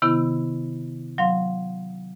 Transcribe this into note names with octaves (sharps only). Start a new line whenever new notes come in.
C3 D#3 B3 E4
F#3 F5 C6